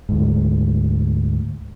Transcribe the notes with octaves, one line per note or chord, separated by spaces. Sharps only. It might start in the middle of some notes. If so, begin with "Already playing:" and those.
D2 G#2